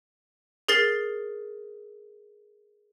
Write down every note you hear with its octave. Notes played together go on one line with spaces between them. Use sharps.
G#4 A#4 A6 C7